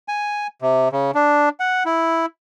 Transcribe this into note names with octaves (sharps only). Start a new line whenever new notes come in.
G#5
C3
C#3
D4
F#5
E4